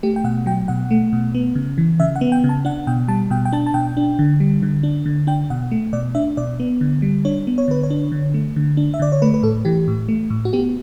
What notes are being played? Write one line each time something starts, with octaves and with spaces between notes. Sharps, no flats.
A3 G4
G5
B2 F#5
F#3 G5
B2 F#5
A3
B2
B3
C#3
E3
C#3 E5
F#5
B3
G5
C#3
A5
D4 F#5
B2 G5
G3 A5
B2 G5
G5
D4 A5
A5
B2 G5
D4
D3
G3
D3
D4
D3
D4 G5
B2 F#5
A3
B2 D5
D4 E5
B2 D5
B3
D3
G3
D4 C#5
B3
C#5
D3 B4
C#5
D4
D3
A3
D3
D4
E5
D3 D5
C#5
A3 B4
B4
A2 A4
E3 G4
A2
A3
A2
F#4
B3 G4